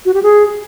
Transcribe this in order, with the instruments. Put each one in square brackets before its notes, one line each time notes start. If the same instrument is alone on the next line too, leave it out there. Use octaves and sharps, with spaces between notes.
[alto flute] F#4
G4
G#4